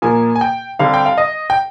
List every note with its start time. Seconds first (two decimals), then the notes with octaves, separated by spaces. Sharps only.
0.02 A#2 F3 A#3 G#5
0.35 G#5
0.41 G5
0.79 D3 G3 C4 F5
0.94 G5
1.06 F5
1.18 D#5
1.50 G5